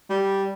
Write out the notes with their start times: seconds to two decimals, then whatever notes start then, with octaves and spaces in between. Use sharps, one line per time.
0.10 G3